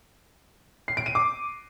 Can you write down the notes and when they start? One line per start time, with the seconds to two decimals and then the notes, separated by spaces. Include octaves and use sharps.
0.88 C7
0.97 D7
1.06 D#7
1.15 D6